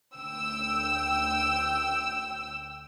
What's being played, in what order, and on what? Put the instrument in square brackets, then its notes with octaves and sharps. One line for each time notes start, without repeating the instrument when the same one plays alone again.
[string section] D2 G5 E6